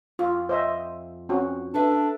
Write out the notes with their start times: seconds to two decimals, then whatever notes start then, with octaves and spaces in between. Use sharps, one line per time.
0.19 F2 F4
0.49 C5 D#5 E5
1.29 C4 C#4 F#4
1.74 D4 A4 B4 E5